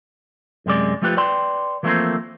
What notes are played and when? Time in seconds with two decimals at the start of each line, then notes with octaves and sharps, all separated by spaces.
0.66 F#2 C3 G#3 D5
1.02 F3 A3 F4 G4 B4
1.17 B4 D5 G5 C6
1.83 E3 F3 A3 A#3 C4 C5